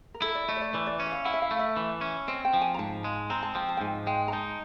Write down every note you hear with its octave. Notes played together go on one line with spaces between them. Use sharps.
A#4
E4 A4
D5
A3 D#5
C#5
D5
E3 D5
D5
C#4
E5
F5
E4 F#5
E5
F5
A3
E5
E3
C#4
C4 D#5
G5
F3
G#5
A#5
G#2 A5
G#3
C4 A#5
A5
F3 G5
A5
G5
G#2 G#5
G#3 G5
A#5
D#4 A5